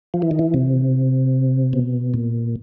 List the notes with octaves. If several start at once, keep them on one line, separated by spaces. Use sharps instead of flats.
F3
E3
D#3
E3
C3
B2
A#2